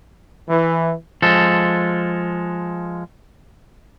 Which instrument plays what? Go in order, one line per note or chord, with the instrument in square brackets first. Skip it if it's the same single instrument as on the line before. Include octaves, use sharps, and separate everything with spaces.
[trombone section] E3
[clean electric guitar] F3 G#3 A4